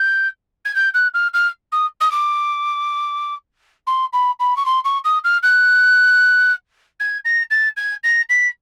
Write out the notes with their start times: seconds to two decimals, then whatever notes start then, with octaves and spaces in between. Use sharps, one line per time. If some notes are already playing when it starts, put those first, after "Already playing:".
Already playing: G6
0.65 G#6
0.75 G6
0.94 F#6
1.14 F6
1.34 F6
1.72 D#6
2.01 D#6
2.11 D6
3.87 C6
4.13 B5
4.40 B5
4.56 C#6
4.66 C6
4.84 C#6
5.04 D#6
5.24 F6
5.43 F#6
7.00 G#6
7.25 A#6
7.51 A6
7.77 G#6
8.04 A#6
8.29 B6